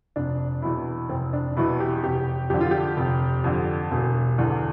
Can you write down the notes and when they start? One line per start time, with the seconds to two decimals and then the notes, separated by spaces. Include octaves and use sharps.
0.16 F1 D4
0.62 E2 B2 E4
1.09 F1 C4
1.33 D4
1.57 E2 B2 E4
1.80 G4
2.03 F1 G4
2.50 F2 D3 G4
2.61 F4
2.71 G4
2.97 F1
3.44 F2 D3
3.91 E1
4.38 E2 D3